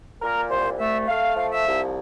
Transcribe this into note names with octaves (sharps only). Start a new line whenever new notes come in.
A#2 A#4
C2 C5
A3 E5
A3 F5
F3 F5
E5
C2